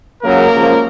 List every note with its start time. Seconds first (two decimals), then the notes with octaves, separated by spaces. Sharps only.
0.22 C#2 C#3 F#3 A#3 A#4
0.51 C#2 C#3 F3